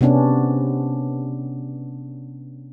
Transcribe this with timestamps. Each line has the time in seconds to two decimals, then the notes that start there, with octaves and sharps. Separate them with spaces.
0.01 C3 B3 C#4 D4